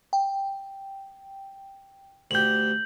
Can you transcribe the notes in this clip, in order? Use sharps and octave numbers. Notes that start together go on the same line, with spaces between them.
G5
D2 G4 G6 F#7